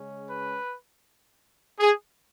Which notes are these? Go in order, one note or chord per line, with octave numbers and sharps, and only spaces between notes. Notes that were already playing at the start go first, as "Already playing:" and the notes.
Already playing: C#3 G#3 C#4
B4
G#4